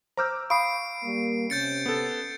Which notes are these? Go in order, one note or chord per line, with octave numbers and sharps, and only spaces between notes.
C5 A#5 D6 E6 F6 G6
F5 B5 C#6 D#6 C7 D7
G3 A#3
C3 C#4 G6 A6 C#7
B3 A4